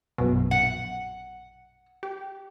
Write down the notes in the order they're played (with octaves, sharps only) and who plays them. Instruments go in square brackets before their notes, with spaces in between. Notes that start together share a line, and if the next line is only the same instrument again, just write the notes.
[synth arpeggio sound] A#1 F#2 B2
[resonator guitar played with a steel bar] F#5
[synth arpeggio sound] G4